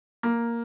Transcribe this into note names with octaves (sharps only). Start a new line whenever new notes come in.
A#3